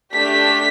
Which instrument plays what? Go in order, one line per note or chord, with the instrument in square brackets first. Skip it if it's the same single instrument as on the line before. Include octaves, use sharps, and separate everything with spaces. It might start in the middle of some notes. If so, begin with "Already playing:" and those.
[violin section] A3 D4 G4 B6